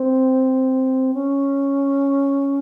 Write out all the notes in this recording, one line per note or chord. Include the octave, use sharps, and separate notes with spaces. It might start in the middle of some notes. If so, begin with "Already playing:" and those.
Already playing: C4
C#4